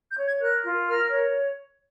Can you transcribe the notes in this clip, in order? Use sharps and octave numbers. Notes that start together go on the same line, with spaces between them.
G6
C#5
G#6
A#4 F#6
F4
A#4 F6
C#5